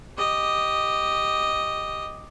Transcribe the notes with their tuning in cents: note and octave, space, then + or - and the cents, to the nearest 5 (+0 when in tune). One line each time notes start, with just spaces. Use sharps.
G4 +0 D#5 +0